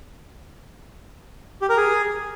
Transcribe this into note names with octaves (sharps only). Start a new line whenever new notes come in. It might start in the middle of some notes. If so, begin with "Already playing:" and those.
G4
A#4
G#4